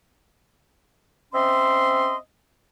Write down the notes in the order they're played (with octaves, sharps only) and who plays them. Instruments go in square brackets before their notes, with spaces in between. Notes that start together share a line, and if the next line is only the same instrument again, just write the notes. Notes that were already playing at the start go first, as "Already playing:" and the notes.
[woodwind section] C4 C#4 D#5 E5 C6